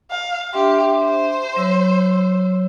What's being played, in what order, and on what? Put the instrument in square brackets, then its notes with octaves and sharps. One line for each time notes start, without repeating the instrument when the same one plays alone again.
[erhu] F5
[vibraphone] D4 E5 C6 [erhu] G4
[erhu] C5
[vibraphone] F#3 C#5 E6